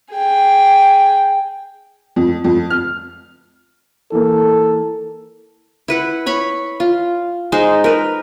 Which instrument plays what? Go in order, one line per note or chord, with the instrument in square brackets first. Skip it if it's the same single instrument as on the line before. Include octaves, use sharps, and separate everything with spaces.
[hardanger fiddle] G#4 G5
[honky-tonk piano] F2
F2
F6
[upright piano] E3 A#3 [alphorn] A4
[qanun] E4 B4 F#5
C#5 B5 C#6
F4
G#3 D#4 C5
A#4 B4